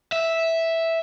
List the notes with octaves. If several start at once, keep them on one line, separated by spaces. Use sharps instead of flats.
E5